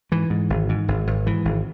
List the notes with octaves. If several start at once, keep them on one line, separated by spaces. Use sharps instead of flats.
G#2 E3
G#2
G#1
G#2
G#1
G#1
G#2 E3
G#1